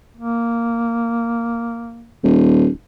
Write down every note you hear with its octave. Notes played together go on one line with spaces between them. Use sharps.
A#3
D#1